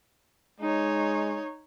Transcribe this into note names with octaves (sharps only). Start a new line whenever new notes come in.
G#3 D#4 C#5